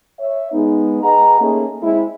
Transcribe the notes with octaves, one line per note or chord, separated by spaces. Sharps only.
C#5 E5
G#3 B3 D#4
G#4 B4 D#5 F#5 A#5
A3 A#3 C#4 D#4 G#4
G#3 C4 E4